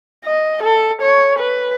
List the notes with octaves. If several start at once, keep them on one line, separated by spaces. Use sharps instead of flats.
D#5
A4
C#5
B4